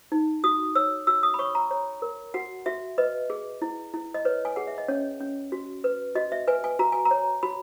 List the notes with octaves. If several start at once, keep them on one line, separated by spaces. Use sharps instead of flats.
D#4
F#4 D#6
C#5 E6
F#4 E6
D#6
B5
C#5 C#6
A#5
C#5
A#4
F#4 F#5
F#4 E5
B4 D#5
G#4
E4
E4
D#5
B4 C#5
G#5
G#4 F#5
E5
D#5
C#4 C#5
C#4
F#4
B4
F#4 D#5
E5
B4 G#5
G#5
F#4 A#5
G#5
A#5
C#5
F#4 B5